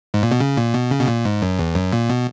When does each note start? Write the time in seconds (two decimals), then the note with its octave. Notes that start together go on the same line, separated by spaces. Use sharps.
0.14 G#2
0.23 A#2
0.31 B2
0.40 C#3
0.57 A#2
0.74 B2
0.91 C#3
1.00 B2
1.08 A#2
1.25 G#2
1.42 F#2
1.59 E2
1.75 F#2
1.92 A#2
2.09 B2